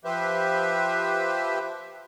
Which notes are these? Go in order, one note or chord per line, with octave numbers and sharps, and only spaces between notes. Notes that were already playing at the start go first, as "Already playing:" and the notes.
F3 G4 B4 C5 E5